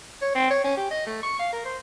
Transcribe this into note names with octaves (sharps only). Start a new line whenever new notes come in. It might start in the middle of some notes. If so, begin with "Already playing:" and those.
C#5
C4
C#5
C#4
G4
D#5
A3
C#6
F5
A#4
C5